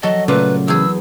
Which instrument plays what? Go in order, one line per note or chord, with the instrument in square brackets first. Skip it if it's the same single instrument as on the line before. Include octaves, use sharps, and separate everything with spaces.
[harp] F#3 [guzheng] A4 [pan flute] D#5
[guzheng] A#2 [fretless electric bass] C#3 A3 [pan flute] B4
[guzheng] E2 G#4 [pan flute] E6